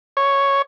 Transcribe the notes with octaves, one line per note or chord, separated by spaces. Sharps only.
C#5